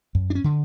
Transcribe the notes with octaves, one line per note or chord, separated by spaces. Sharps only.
F#2
D4
C#4
D3